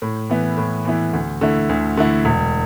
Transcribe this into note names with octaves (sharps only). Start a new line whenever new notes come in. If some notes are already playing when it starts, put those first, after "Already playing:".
A2
E3 B3 E4
A2
E3 B3 E4
D2
D3 A3 E4
D2
D3 A3 E4
E1